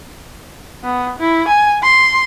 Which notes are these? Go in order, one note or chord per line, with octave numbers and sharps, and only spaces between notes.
B3
E4
G#5
C6